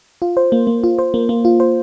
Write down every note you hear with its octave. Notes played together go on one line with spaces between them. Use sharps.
F4
C5
A#3
A#3
F4
C5
A#3
A#3
F4
C5